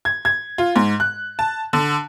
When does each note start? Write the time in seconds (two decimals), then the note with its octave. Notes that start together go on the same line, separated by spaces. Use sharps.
0.05 G#6
0.25 G#6
0.58 F4
0.76 G#2
1.00 F#6
1.39 A5
1.73 D3